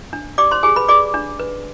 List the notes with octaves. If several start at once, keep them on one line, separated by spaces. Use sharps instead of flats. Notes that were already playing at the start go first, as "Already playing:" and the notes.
D4
G4 D5 D6
C5 C6
G4 G#4 G#5
B4 B5
G#4 D5 D6
D4
B4